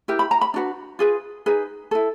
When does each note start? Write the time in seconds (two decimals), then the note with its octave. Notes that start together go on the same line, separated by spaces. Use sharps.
0.08 E4 G4 A#4
0.19 B5
0.31 A#5
0.41 B5
0.54 D4 F#4 B4
0.99 F4 G#4 B4
1.46 D#4 G#4 B4
1.91 E4 A4